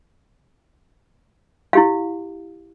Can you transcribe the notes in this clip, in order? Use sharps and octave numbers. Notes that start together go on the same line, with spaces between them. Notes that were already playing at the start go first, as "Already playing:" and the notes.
E4 G4 F5